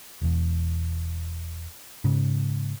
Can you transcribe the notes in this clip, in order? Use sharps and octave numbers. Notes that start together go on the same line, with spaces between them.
E1 E2
G#2 C#3